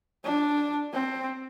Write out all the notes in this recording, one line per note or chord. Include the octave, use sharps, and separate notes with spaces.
D4
C4